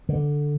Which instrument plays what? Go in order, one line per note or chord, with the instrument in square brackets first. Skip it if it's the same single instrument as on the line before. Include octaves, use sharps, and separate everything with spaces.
[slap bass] D3